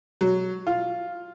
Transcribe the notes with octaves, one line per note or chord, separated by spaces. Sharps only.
F#3
F4